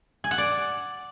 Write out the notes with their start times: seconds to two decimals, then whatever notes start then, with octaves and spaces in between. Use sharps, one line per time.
0.24 G#5
0.31 F#5
0.38 D5